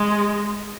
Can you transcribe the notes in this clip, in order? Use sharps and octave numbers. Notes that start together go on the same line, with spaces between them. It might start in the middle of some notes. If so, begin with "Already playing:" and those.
Already playing: G#3